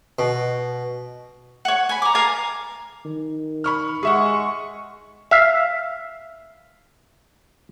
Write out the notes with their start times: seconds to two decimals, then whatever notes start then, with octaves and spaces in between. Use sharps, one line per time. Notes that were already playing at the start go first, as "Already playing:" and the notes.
0.19 B2
1.65 C#5 F#5
1.89 G#5 B5
2.02 A#5 D6
2.15 A#4 F5 G#5 A5
3.05 D#3
3.64 B5 C#6 F6
4.03 G#3 G#4 E5 F#5 C#6
5.31 E5 F5